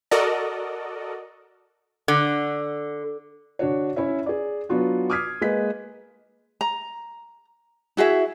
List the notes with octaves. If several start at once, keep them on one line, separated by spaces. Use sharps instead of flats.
F#4 A4 A#4 D5 D#5
D3
D3 D4 F#4 C#5
C#4 E4 C#5 E5
G#4 D5
F#3 B3 D4 F4 F#4
D6 D#6 F6 G#6 B6 C7
G#3 A#3 B4 D#5 B6
A#5
E4 F#4 G#4 E5